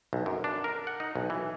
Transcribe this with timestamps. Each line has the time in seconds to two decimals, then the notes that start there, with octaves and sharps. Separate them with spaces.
0.13 B1
0.26 F#2
0.44 D4
0.64 A#4
0.87 F#5
1.00 D#4
1.16 B1
1.30 E3